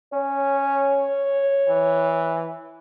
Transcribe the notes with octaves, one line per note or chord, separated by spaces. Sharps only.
C#4 C#5
E3